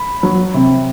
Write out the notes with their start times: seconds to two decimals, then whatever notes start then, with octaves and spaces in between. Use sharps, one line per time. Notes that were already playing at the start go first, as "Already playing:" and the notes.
Already playing: B5
0.23 F#3
0.54 C3